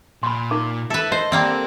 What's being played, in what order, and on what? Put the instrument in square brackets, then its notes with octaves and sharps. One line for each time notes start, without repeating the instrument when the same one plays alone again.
[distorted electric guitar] A#2 [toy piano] B5 C6
[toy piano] D#4 A#4 D6
[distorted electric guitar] E4 [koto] A4 B4
[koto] C5 [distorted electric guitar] D#5
[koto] G3 A#3 C4 [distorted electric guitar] A4 D5